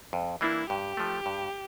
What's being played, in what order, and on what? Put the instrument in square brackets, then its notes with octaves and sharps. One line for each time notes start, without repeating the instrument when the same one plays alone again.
[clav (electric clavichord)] F2
[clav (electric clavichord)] E3 A#3 D4 [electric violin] E4
[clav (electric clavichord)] G2 [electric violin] G4
[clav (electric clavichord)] F3 A3
G2